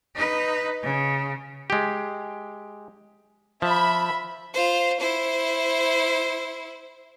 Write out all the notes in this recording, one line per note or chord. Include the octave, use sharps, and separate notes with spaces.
D#4 B4
C#3
G#3 G4
F3 E5 B5
F4 C5
E4 C5